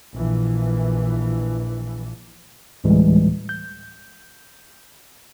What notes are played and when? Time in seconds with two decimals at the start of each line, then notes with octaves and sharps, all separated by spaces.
0.16 A#1 E3
2.84 D2 A2 E3 G3 G#3
3.49 G6